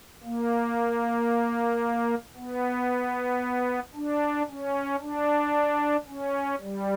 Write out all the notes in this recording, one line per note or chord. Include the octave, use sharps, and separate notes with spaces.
A#3
B3
D4
C#4
D4
C#4
G3